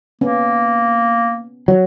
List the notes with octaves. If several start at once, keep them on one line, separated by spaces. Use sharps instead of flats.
A#3 B3 C#4
F#3